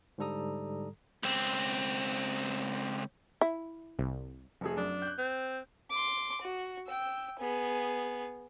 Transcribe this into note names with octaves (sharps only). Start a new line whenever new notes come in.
G#2 D3 G3 A4 A#5 D#6
C#2 C4
E4
C2
F1 A3 G#4
F#2 D4
F#6 G6
C4
C6 D6
F#4
G5 E6
B3 G#4